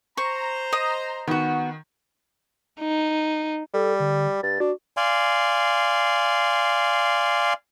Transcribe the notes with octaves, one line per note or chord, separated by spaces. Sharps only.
C5 A#5 C#6
D#5 D#6
D#3 B3 F#4
D#4
G3 A4
D3
G2 A6
D4 F#4
D5 F5 G#5 C6